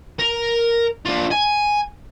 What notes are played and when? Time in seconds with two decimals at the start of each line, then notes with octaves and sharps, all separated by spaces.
0.19 A#4
1.06 D4 F4
1.31 G#5